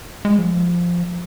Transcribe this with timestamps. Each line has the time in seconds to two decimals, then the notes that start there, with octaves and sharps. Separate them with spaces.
0.25 G#3
0.38 F3